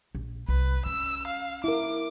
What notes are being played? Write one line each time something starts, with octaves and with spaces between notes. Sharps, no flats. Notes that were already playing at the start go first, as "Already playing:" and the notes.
A#1
C2 B4
C#4 E6
F5
E4 A#4 D6